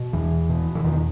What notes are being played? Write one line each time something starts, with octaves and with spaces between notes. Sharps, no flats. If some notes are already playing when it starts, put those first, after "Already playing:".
Already playing: B2
E2 E3
B2
E3
E2 D#3